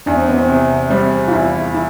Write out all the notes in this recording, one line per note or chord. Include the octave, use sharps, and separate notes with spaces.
E2 D4
C4
B3
C4
C3
G3 C4
F4
E2 E4
E4